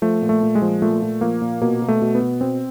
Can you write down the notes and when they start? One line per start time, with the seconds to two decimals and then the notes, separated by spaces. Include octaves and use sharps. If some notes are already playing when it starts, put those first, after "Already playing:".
0.02 F3 A3
0.22 A#2
0.29 A3
0.43 A#2
0.55 G#3
0.62 F3
0.82 A#2 A3
1.02 A#2
1.21 F3 A#3
1.42 A#2
1.62 B2 A#3
1.82 B2
1.88 A3
2.02 B2
2.15 B3
2.22 B2
2.41 B2 C4